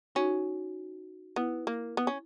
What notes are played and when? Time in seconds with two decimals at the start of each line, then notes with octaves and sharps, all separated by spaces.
0.15 C#4 D#4 F#4
1.36 B3 E4
1.67 A#3
1.97 B3
2.07 C#4